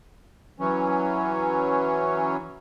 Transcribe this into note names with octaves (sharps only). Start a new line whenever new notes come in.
E3 F#3 C#4